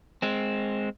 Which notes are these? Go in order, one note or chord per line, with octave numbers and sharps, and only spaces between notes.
G#3 C4